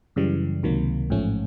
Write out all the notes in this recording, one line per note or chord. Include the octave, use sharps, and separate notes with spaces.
F#2 C#3 E3 G3
C#2 C3 D#3 F#3 A#3
A1 G#2 F3 A3 C#4